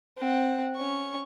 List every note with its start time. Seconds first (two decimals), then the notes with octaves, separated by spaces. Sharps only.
0.18 C4 F#5
0.77 C#4 C#6